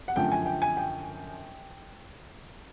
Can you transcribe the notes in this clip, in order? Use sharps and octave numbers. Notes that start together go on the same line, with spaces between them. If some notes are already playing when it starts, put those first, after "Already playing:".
F#5
F#2 D3 F3 A3 G5
G#5
G5
G#5
G5